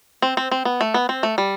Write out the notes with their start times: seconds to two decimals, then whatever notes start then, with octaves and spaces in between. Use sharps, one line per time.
0.22 C4
0.37 C4
0.51 C4
0.65 B3
0.81 A3
0.94 B3
1.09 C4
1.23 A3
1.38 G3